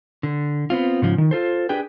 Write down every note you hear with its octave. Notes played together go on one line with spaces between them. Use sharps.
D3
B3 C4 F4
G#2 C#3 F3
D#3
F4 A4 C5
D4 G4 G#4 B4 G5